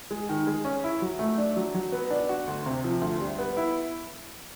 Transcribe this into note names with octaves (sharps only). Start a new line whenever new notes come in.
G#3
D#3
G#3
C#4
E4
F#3
A3
D4
F#3
F#3
B3
D4
F#4
D2
C3
F3
D2
G3
B3
E4